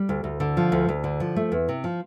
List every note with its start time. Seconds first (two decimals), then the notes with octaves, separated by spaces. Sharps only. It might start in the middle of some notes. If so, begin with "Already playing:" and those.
Already playing: G3
0.09 D2
0.24 D2
0.40 D3
0.57 F3
0.72 D2
0.89 D2
1.04 D3
1.20 F3
1.36 A3
1.52 E2
1.69 C3
1.84 F3